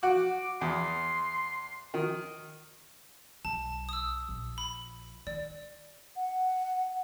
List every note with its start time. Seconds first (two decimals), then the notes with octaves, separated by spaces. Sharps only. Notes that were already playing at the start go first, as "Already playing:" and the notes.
0.03 F#4 D6
0.61 E2 C6
1.94 D#3
3.45 B1 A5
3.89 D#6 E6
4.29 A#1
4.58 B5
5.27 D#3 D5
6.16 F#5